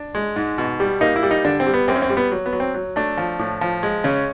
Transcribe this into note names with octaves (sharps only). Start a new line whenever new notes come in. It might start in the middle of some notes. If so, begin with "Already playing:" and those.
Already playing: D4
G#3
G#2
B2
G3
A#3 D#4
E4
G3
D#4
D3 D4
C4
G3
B3
F#2 C4
C#4
C4
G3
B3
F#3
B3
F#3
C4
F#3
A3 D4
F3
A2
F3
G#3
C#3 C#4